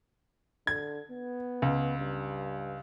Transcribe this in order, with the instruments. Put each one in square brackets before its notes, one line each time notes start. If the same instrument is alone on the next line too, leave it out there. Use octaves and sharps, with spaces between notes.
[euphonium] D3 [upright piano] G#6
[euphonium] B3
[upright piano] C#2
[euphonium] G2